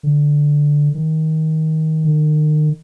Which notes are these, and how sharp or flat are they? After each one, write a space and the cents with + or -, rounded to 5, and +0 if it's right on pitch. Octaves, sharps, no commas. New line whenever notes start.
D3 +0
D#3 +20
D#3 -35